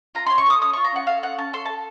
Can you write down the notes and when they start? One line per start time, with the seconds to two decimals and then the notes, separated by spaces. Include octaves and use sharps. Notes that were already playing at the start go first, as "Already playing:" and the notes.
0.15 F4 A#5
0.26 C6
0.30 C#4
0.38 C#6
0.46 A4 D#6
0.61 C#4 D#6
0.73 C#6
0.77 F4
0.84 A#5
0.92 C#4 F#5
1.07 A4 F5
1.23 C#4 F#5
1.38 C#4 A5
1.53 A4 C6
1.65 A5
1.69 A4